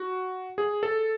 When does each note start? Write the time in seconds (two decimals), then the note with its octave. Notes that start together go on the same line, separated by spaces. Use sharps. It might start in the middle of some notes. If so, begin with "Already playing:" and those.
Already playing: F#4
0.58 G#4
0.83 A4